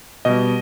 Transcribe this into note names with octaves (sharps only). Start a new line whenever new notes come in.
B2 G3 D#5